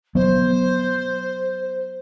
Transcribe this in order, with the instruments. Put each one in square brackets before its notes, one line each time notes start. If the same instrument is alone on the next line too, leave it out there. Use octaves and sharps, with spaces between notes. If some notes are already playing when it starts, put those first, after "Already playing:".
[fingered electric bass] F#3 B3 [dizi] C5